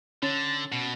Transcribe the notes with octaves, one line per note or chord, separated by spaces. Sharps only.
D3 C#4 A6
B2